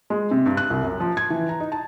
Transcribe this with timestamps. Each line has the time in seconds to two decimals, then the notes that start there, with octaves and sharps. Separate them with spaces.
0.10 G#3
0.31 C3
0.46 G2
0.57 F#6
0.70 C2
0.83 F#2
1.00 F3
1.17 G#6
1.30 E3
1.49 A#5
1.60 D#4
1.72 A5